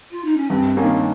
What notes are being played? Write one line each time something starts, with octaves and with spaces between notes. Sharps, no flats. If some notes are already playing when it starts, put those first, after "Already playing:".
F4
D#4
C#4
G2 C4
D#3 A#3 C#4